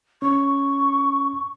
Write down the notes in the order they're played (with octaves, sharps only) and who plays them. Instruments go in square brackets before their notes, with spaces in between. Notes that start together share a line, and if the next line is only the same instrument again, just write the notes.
[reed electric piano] C#4 [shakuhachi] C#6